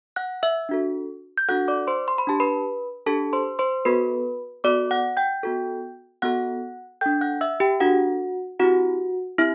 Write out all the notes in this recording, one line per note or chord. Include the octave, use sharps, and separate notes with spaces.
F#5 F#6
E5 E6
D4 F#4 A4
G6
D4 F#4 A4 F#5 F#6
D5 D6
C5 C6
C6
B5
D4 G4 A5
B4 B5
D4 G4 A4 A5
C5 C6
C5 C6
B3 F#4 A4 B4 B5
B3 F#4 A4 D5 D6
F#5 F#6
G5 G6
B3 F#4 A4
B3 F#4 A4 F#5 F#6
D4 A4 G5 G6
F#5 F#6
E5 E6
G4 G5
D4 F#4 A4 F#5
C4 E4 F#4 G4 F#5
C4 E4 G4 E5